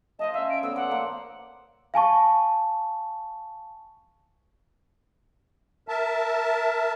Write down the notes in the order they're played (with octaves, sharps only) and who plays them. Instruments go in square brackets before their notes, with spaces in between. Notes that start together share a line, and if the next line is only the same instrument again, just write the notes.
[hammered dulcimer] C5 F5 A5 [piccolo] D#5
[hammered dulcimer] C#4 F5 [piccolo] E5
[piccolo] D7
[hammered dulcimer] B3 A4 D5 [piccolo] E6
[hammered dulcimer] C5 F5 [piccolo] F#5
[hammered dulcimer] A#3
[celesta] F5 G#5 A5 C#6
[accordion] A#4 E5 A5